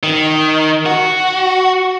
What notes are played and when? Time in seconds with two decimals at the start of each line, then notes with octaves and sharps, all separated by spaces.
0.03 D#3
0.86 F#4